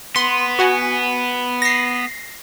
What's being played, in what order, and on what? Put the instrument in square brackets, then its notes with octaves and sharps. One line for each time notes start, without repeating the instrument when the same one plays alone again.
[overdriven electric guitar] B3 [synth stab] C6
[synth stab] F#4 F#5 G#5
A#6 C7